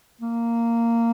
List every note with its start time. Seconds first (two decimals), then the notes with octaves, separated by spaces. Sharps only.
0.21 A#3